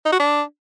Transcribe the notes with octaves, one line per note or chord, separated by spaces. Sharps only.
D#4
F#4
D4